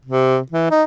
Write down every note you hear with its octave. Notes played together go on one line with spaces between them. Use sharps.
C3
E3
D#4